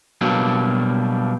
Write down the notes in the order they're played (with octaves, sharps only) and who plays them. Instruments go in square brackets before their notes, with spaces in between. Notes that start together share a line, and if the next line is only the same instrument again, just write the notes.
[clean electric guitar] B2 F#3 G3 A#3 D4